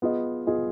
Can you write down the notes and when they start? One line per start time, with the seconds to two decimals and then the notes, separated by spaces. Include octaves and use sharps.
0.02 B3 F4 G#4 D#5
0.47 B3 F4 G#4 D#5